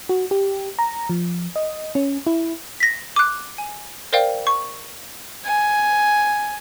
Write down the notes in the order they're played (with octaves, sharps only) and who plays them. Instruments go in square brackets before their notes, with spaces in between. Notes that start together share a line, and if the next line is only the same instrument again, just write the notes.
[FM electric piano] F#4
G4
A#5
F3
D#5
C#4
E4
[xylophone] A#6 B6
D6 F#6
G#5
A#4 C5 D5 F5 G5
C#6
[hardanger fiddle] G#5